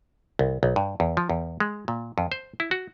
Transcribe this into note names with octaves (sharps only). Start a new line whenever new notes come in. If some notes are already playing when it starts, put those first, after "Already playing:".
C2
B1
G2
E2
F3
E2
G#3
A#2
F2
C5
E4
F#4